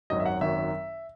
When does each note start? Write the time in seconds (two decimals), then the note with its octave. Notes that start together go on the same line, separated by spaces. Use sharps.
0.10 G#1 F#2 D#3 F#3 D#5
0.20 E5
0.26 F#5
0.41 G#1 F#2 D#3 F#3 E5